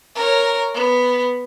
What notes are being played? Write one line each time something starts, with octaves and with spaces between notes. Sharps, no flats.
A#4 C#5
B3